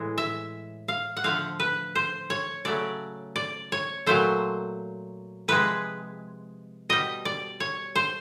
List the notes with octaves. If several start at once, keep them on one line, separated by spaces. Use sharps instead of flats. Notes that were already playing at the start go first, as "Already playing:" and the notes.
Already playing: A2 E3 G#3
E5
F5
F#5
D3 F3 A3 F5
B4
C5
C#5
C#3 F#3 A3 D5
D5
C#5
A#2 F#3 A3 C5
C3 F3 G#3 B4
B2 G3 D#5
D5
C#5
C5